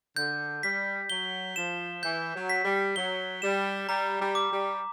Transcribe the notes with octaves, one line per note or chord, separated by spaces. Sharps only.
D3 G6
G3 B6
F#3 G7
F3 E7
E3 G6
F#3
B6
G3
F#3 G7
G3 E7
G3 A#5
G3
D6
G3